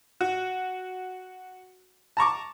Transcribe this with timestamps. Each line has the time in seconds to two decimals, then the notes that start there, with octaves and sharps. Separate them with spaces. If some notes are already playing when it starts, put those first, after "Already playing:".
0.21 F#4
2.17 A5 A#5 C#6 D6